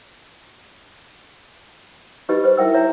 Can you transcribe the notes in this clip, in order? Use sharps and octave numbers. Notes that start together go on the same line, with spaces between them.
D#4 G4 B4 D#5 B5
B4 C5
E4 A#4 E5 G5 E6
C#5 E5 A#5